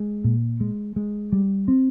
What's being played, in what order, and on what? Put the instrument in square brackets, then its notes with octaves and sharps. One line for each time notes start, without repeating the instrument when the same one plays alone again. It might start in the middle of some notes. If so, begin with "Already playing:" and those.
Already playing: [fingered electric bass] G#3
A#2
G#3
G#3
G3
C4